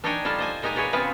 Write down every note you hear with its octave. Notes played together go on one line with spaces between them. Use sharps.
D4 D#4 C#5 D#5 G5 G#5
G3 F4 A4 F5
C5 D#5 G#5
A#2 G#3 D#4 G4 G#5 A#5
F#4 G#4 B4 C#5 D5 G5
C#3 B3 C4 F4 G#4 B4